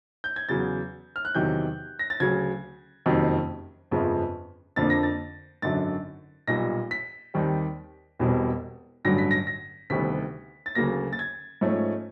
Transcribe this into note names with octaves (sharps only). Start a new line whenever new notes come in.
G6
G#6
E2 C#3 F#3 A6
F6
F#6
E2 C3 D#3 F#3 G6
A#6
A6
D2 C#3 F#3 G#6
F#1 F2 C3 D#3 F#3
G1 F2 C#3 F3 G#3
F2 D3 F3 A#3 D4 A6
A#6
A6
G#1 F#2 D3 F#3 A6
B1 A#2 G3 A#6
B6
D#2 D#3 G3 C4
E1 E2 B2 G3 C4
A1 G2 D3 F#3 A#6
B6
A#6
A#6
D2 C3 D#3 G3 B3 B6
A6
D2 C#3 F#3 A#3 A#6
A6
G#6
G#2 F3 A3 C#4